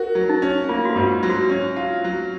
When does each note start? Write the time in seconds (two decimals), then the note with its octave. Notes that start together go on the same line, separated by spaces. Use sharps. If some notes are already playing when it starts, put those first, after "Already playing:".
Already playing: F#4 A#4
0.15 F#3
0.29 D#4
0.42 C#4
0.69 A#3 F4
0.85 F#4
0.89 F4
0.96 G#2
1.23 F#3
1.29 F#4
1.49 C#4
1.76 F4
2.04 F#3